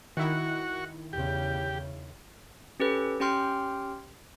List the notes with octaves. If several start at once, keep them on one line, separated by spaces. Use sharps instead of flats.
D#3 E4 F#4 C#6
E2 C#3 G4
C#4 G4 A4 B4
C#4 G4 G5 C6 F6